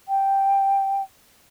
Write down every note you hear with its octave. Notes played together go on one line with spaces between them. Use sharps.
G5